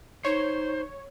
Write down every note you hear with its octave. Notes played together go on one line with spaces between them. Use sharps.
D#4 C5 C#5